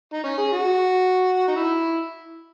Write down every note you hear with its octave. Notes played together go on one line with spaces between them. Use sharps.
D#4
C#4
G#4
F#4
D#4
E4